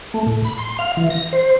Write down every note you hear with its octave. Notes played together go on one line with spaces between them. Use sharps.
A3
A2
B5
C6
F5
E3
A#6
C5